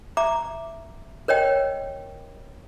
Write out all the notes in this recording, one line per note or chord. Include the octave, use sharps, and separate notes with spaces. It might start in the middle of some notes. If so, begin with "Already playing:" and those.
E5 A#5 D6
A#4 C#5 D#5 G5